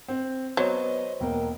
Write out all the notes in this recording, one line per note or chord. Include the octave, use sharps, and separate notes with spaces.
C4
F#3 B3 C5 C#5 D#5
E1 A#3 G5